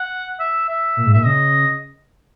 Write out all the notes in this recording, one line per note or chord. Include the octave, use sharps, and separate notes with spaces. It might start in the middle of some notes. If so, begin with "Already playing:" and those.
Already playing: F#5
E5
E5
A#2
G#2
A#2 E5
C#3 D#5